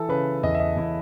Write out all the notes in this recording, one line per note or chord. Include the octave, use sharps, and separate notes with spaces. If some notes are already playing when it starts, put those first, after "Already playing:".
Already playing: E3 A4
C#3 B4
E2 D#5
E5
D#5
E2 E4